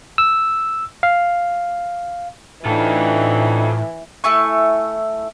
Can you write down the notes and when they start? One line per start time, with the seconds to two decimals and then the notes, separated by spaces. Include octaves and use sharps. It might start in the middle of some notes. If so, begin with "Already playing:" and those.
0.18 E6
1.03 F5
2.66 A2 E3 D4 D#4 F4 A4 G5
4.24 A3 E4 G#5 C#6